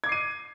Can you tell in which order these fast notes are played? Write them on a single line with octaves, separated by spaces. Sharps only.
G#6 D6 C7 D#7